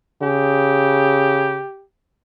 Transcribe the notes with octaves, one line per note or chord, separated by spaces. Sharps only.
C#3 G4